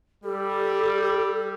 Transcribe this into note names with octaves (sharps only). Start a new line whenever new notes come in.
G3 G4 A4